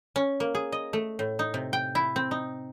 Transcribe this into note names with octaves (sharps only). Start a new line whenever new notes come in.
C#4
A#3
G#4
D#5
A3
A2
D#4
C3
G5
E4
C4
D#4